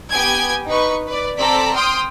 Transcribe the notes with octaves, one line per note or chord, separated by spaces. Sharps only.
B3 G4 G5 G#5 G#6
D#4 B4 C#6
B4 D5
C4 A4 D5 A#5 B6
G5 C6 D#6 F6